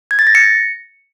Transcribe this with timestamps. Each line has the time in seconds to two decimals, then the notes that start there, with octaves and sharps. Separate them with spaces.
0.11 G#6
0.19 A6
0.27 A#6
0.35 C#7